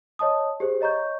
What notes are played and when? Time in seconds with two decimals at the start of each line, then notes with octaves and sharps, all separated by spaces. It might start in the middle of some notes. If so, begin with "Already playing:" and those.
0.19 C#5 D#5 A5 D#6
0.60 G4 G#4 C5
0.81 C#5 D#5 A#5 C#6 G6